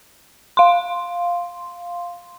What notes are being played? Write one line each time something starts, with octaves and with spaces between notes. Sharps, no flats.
F5 C6